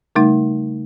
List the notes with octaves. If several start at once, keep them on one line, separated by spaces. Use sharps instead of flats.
C#3 G3 A3 D#4